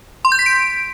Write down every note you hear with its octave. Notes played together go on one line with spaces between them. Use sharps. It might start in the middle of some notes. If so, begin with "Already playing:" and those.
C6
G6
B6
D7